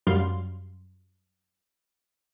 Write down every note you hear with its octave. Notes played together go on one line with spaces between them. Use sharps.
F#2 G3 F5 C6